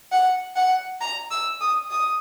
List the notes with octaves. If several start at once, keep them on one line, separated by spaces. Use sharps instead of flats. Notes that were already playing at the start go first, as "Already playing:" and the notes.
F#5
F#5
A#5
E6
D#6
D#6